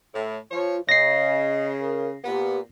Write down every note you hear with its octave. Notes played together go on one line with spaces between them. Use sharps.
A2
F3 F4 C#5
C#3 D#5 A#6 C7
A#4
A#2 B3 G4